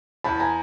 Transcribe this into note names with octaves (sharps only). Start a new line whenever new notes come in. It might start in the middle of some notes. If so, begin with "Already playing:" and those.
E2 A5 B5
G#5 A#5